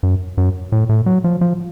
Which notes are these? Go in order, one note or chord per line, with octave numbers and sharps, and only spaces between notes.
F#2
F#2
A2
A2
F#3
F3
F3